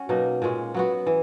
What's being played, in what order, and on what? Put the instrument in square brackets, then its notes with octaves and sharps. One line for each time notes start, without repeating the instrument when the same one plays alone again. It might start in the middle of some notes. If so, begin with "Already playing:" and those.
Already playing: [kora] C#4 F#4
B2 F#3 A#3 D#4
A#2 G#3 C#4
F#3 B3 F#4
E3